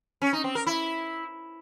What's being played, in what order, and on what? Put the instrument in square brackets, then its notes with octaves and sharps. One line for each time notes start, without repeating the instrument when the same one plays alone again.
[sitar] C#4
D#4
C4
A#4
E4